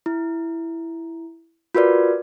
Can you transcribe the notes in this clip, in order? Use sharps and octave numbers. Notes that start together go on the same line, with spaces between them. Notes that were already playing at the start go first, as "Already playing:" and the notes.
E4
F4 F#4 A#4 B4 D5